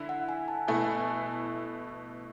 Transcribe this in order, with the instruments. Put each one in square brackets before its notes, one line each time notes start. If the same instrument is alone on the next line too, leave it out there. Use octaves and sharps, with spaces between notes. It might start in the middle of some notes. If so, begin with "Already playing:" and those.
Already playing: [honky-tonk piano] D3 E4
[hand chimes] F#5
G#5
A5
[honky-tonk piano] B2 A3 E4 [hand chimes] G#5